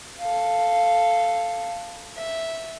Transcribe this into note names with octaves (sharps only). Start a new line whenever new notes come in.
A4 F5
E5